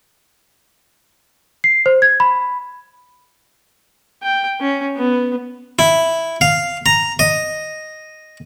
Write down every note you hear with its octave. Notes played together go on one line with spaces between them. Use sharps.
C7
C5
G#6
B5
G5
C#4
B3
E4
F5
A#5
D#5